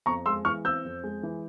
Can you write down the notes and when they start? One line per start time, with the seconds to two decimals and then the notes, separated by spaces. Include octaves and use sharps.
0.06 F2 A#5 C#6
0.26 G#3 C6 E6
0.45 E3 C#6 F6
0.65 C4 E6 G6
0.85 F2
1.04 G#3
1.23 E3